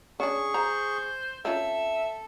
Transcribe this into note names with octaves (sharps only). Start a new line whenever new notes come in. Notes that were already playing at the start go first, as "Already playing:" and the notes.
C#4 D4 G#4 C#6
C5 A#5
C4 C#4 F4 A4 E5